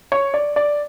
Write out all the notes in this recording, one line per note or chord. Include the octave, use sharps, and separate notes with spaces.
C#5
D5
D5